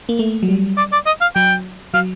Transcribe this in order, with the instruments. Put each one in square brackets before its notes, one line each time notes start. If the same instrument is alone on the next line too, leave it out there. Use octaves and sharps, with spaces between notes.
[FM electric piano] A#3
A3
F#3
G3
[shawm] D5
D5
D#5
F5
[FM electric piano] F#3 [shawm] G5
[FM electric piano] F#3 [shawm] F5